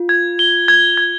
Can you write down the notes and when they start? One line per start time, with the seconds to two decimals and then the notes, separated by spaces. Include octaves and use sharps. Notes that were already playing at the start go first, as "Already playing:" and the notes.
Already playing: F4
0.09 G#6
0.39 G7
0.68 G#6
0.97 G#6